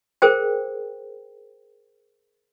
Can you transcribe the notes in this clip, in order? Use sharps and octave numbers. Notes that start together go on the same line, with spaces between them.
G#4 A#4 C5 G5